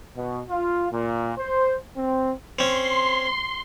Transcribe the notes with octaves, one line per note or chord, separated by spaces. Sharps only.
B2
F4
A#2
C5
C4
C4 C#4 C6